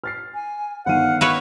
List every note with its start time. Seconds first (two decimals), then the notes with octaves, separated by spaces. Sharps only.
0.04 F6 A6 C7
0.34 G#5
0.86 G1 D#3 F5 F#5 D#7
1.21 E4 B4 C#5